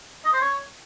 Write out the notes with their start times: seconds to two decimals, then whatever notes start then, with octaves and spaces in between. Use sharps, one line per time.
0.25 D#5
0.33 C5
0.41 C#5